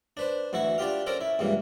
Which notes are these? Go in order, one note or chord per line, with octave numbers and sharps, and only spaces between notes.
D4 B4 C5
D2 E3 E4 F#4 C#6
D4 F4 G4 F5
C#4 A4 A#4 C5 D5
E4
C#2 G2 E3 A#3